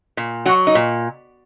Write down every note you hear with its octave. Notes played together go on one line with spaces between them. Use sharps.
A#2
F#3 F#4
D#4
A#2